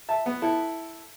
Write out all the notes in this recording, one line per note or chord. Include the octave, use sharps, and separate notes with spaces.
E5 A5
B3
E4 A4